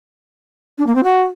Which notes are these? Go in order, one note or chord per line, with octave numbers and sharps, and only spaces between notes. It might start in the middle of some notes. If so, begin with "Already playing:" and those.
D4
A#3
C4
F#4